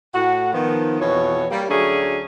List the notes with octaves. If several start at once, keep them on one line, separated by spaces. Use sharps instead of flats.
A2 F#4 F#5
D#3 F3 B3
F2 B2 E3 C#5
G3 A#3 G4
D2 F#3 A3 C#4 D4 G#4